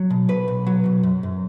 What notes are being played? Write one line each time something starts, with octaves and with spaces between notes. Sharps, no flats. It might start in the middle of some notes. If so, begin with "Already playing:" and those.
Already playing: F#3
B2
B1 B4
B1
F#3
B2
F#2
F#2